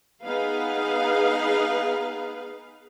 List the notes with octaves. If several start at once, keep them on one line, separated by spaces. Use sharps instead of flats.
B3 D#4 G#4 B4 F5